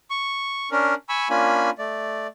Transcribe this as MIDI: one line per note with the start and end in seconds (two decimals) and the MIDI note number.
0.11 0.69 85
0.71 0.94 61
0.71 0.94 62
0.71 0.94 70
1.09 1.28 80
1.09 1.28 83
1.09 1.28 85
1.09 1.28 88
1.30 1.70 58
1.30 1.70 61
1.30 1.70 62
1.30 1.70 65
1.30 1.70 80
1.30 1.70 83
1.79 2.27 57
1.79 2.27 74